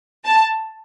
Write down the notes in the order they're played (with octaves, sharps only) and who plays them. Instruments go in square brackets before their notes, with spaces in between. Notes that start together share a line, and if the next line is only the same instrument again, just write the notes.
[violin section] A5